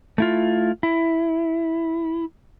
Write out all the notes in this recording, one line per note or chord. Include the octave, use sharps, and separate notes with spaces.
A3 E4 F4
E4